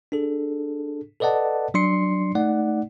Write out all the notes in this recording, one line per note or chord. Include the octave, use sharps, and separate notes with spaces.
D4 G#4 A4
A4 B4 D5 D#5 F#5 A5
F#3 D4 D5 C6 C7 C#7
A3 D#4 D5 F#5